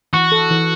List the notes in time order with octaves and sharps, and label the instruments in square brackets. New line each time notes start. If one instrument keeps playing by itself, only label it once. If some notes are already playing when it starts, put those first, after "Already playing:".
[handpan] E3 [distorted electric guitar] F#4
[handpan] A4
E3